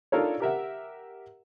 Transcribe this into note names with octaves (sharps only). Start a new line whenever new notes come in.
D4 D#4 F4 A4 A#4 C#5
G4 A#4 E5 F#5